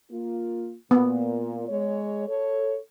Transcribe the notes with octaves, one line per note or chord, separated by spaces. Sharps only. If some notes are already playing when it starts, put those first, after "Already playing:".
A#3 F4
A#2 B3
G#3 C#5
A4 C#5